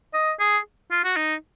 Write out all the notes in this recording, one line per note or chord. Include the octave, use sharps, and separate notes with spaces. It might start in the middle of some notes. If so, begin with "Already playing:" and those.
D#5
G#4
F4
F#4
D#4